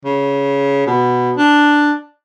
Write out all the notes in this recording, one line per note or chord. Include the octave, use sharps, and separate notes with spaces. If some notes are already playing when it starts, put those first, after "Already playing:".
C#3
B2
D4